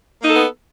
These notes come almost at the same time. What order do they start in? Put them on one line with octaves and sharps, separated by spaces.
A#3 D#4 A4 B3